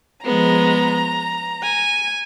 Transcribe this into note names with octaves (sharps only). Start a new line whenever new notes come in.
F3 G#3 B3 A#5
G#5